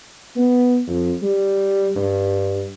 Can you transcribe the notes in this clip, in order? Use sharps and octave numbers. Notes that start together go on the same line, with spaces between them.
B3
F2
G3
G2